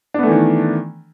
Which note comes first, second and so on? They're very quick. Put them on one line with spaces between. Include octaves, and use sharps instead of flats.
D4 B3 A3 E3 D#3